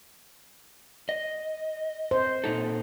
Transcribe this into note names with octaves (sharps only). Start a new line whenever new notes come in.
D#5
C5
A#2 D#4 A4